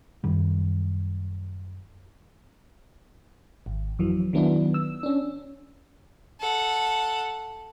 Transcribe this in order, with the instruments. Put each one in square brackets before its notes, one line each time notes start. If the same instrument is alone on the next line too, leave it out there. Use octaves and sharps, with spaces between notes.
[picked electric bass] F#2 D#3 G3
[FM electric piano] G#1
F2 E3 F#3
D#3 F#3 B3 D4 E4
E6
C#4 D4
[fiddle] A4 F#5